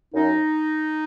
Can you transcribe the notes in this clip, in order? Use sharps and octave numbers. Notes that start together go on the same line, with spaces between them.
F#2 D#4